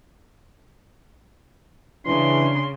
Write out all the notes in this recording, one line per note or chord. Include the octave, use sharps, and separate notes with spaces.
C#3 E3 D4 C6